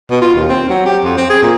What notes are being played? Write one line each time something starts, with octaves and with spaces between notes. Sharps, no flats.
B2
F4
D#2
C4
F#3
G4
F2
C4
G#4
A#2